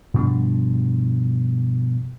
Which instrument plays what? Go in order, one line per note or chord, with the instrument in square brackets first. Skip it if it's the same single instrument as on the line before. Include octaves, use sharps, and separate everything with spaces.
[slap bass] G2 B2 F3 D4